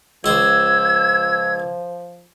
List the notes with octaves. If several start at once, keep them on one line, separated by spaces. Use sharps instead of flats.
C#2 F3 C5 E6 G#6